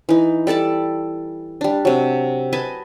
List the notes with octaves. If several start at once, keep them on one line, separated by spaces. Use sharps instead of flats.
E3 D#4
G3 A4 D5 A5
G3 D4
C3 F#3
B4 D#5 G#5 A5